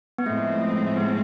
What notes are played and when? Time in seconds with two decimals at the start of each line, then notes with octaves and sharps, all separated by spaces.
0.18 B3
0.26 A2 F3 G#3 A3 C4
0.61 A3
0.97 B3